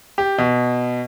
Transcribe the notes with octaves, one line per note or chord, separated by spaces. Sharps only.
G4
B2